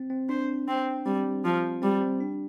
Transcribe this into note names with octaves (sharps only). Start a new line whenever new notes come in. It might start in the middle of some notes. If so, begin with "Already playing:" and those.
Already playing: C4
C4
D4 C5
C4
G3 C4
F3
G3 C4
C4
D4